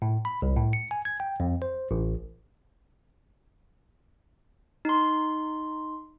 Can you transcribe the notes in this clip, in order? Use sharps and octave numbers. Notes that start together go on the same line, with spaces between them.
A2
B5
C2
A2
C#7
G#5
G#6
G5
F2
C5
A1
D#4 C6